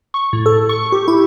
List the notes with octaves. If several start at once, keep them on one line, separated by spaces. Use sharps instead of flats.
C#6
A2
A4
C#6
G4
E4